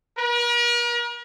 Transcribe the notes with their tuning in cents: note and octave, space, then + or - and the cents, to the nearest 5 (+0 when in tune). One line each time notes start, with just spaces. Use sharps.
A#4 +45